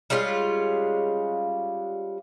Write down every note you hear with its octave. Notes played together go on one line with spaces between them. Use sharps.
G3 G#3 C#4 F4